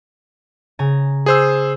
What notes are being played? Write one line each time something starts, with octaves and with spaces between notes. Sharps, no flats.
C#3 G#5 A#5
G#4 C5 E6